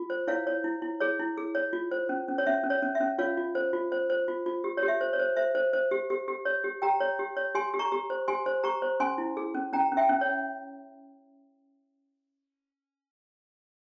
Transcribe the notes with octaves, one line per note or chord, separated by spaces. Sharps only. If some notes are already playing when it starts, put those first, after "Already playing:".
Already playing: F4
C5
E4 C#5 F5
C#5
E4
E4
G#4 C#5
E4
G#4
C#5
F4
C5
C#4
C#4
C#5
C#4 E5
C#4
C#5
C#4
E5
C#4
F4 C#5 F5
F4
C5
F4
C5
C5
F4
F4
G4
C#5
G4
E5
C5
C#5
C5
C5 E5
C5
C5
G4
G4
G4
C#5
G4
G4 G5 A#5
C#5
G4
C#5
G4 G#5 C6
G4
A#5 C#6
G4
C5
G4 G#5 C6
C5
G4 A#5 C#6
C5
C#4 G#5 C6
E4
G#4
C#4
C#4 G5 A#5
C#4
E5 G5
C#4
C#5